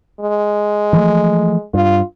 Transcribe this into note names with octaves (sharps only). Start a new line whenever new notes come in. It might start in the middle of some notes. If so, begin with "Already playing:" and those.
G#3
E3 F3 A3
G2 F4